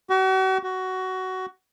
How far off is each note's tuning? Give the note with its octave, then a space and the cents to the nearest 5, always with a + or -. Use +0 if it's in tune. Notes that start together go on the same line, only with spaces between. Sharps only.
F#4 +40
F#4 +15